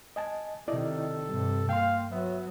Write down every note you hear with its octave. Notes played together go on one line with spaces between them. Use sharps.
D#5 G#5 A5
C3 D#3 E4 A4 D5 D#5
G2 C3 G3
A#3 F5 G5 C6
F#3 B3 E5